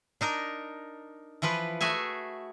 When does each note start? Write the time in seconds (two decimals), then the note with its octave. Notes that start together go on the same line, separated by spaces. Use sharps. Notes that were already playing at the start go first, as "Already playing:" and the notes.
0.21 D4 D#4 A#4
1.42 E3 F3 F4 B4
1.81 A3 F#4 G#4 E5 G#5